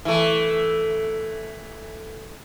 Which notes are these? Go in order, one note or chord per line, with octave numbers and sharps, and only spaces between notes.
E3 A3